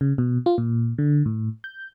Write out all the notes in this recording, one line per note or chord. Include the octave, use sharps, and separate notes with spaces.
C#3
B2
F4
A#2
D3
A2
G6